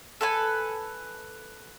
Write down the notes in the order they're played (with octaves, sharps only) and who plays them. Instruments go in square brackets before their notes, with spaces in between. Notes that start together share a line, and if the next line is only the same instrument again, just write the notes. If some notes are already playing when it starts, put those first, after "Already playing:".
[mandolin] A4 B4 G#5